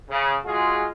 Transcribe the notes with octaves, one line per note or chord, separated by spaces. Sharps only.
C#3
G#3 F4 F#4 G#4